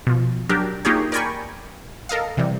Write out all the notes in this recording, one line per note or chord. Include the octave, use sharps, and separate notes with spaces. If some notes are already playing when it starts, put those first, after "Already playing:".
B2 F3
F#3 D4 G4 A#4
A#3 D#4 F4 G4 G#4 C#5
A#4 D5 G5 G#5 B5 C#6
A4 A#4 D#5 F5
C3 E3 G3